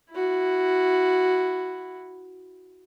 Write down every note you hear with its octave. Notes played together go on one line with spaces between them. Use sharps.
E4 F#4